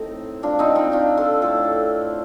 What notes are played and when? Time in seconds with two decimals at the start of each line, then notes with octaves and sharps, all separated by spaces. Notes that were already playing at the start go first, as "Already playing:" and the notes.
Already playing: A2 A3 C4 D#4
0.43 D4 F4
0.59 C4 D#4
0.75 C4 D#4
0.92 D4 F4
1.17 F4 A4
1.42 A2 A3 F4 A4